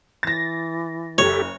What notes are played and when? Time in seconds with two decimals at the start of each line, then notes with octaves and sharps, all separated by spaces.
0.23 E3 A6 A#6
1.18 F#1 G4 A4 C#5